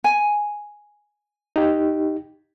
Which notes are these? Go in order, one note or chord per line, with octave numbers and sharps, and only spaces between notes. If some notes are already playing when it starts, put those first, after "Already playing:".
G#5
D#4 G4